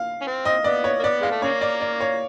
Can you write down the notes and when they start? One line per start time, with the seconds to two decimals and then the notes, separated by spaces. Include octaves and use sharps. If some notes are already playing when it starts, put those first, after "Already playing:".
Already playing: F5
0.22 C#4
0.27 C4
0.45 D#5
0.64 B3 D5
0.84 C#5
1.00 A#3
1.03 B3 D5
1.21 G#3 F5
1.31 A3
1.42 C#3 A#3 C#5
1.61 D5
1.81 D5
2.01 C#5